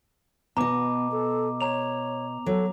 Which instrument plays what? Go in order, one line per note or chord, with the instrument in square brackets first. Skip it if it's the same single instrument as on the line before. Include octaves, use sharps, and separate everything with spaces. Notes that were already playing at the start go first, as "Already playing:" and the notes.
[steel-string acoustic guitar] B2 D#5 [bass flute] B3 [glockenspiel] A#5 D6
[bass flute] A4
[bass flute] C#5 [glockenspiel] A#5 F7
[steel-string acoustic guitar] F#3 [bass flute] A4